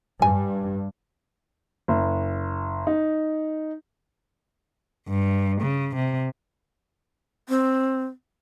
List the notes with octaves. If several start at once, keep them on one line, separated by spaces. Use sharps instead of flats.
G2 G#5
F#1
D#4
G2
C#3
C3
C4